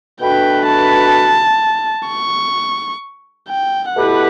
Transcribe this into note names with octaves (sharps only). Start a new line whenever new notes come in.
B2 A3 D4 F#4 B4 G5
A5
C#6
G5
B2 A3 E4 G4 B4 F#5